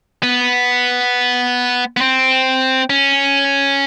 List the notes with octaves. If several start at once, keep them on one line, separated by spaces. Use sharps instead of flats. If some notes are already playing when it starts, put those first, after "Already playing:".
B3
B3
C4
C#4